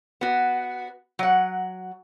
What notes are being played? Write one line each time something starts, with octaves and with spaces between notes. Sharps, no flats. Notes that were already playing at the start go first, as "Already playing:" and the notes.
B3 F#4
F#3 F#5